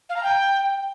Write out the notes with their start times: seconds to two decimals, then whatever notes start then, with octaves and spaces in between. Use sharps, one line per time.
0.09 F5
0.16 A#5
0.23 G5